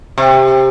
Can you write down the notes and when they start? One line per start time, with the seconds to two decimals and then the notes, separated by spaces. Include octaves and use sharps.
0.18 C3